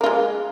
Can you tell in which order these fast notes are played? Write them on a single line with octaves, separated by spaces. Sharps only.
A#3 F4 G#3